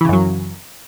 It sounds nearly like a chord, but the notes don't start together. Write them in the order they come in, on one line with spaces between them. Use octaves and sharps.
E3 C#3 F#2 F#3